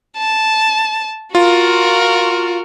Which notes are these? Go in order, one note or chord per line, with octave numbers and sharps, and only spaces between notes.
A5
F4 F#4 A#4